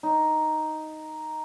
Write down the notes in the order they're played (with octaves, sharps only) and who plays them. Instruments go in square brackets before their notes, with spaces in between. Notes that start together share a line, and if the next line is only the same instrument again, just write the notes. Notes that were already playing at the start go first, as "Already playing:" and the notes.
[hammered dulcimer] D#4